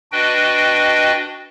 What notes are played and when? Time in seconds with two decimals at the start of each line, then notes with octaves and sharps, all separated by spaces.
0.12 D4 F#4 B4 D#5 G5